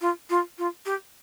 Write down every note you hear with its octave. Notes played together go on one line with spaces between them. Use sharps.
F4
F4
F4
G4